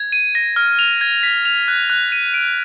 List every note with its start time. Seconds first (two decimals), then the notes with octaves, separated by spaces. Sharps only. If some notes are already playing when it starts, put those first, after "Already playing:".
Already playing: G#6
0.12 D#7
0.35 A#6
0.56 F6
0.79 F7
1.01 G#6
1.23 B6
1.45 F7
1.68 F#6
1.90 F#6
2.12 D#7
2.34 D7